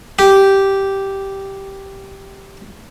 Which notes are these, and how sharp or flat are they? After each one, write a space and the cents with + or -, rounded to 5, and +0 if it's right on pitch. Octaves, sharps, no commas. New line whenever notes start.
G4 -5